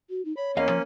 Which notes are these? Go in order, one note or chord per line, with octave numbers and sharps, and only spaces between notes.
F#4
D#4
C#5 B5
E2 A#3 C#4 D#5 F5
F3